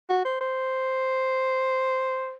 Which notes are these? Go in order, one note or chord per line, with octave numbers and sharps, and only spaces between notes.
F#4
C5
C5